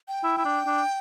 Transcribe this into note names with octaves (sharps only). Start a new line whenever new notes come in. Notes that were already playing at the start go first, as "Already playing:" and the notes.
G5
E4
E4
D4
D4